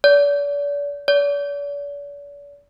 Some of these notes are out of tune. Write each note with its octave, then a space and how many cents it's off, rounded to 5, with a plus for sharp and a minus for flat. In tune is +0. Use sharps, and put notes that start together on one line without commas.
D5 -40
D5 -45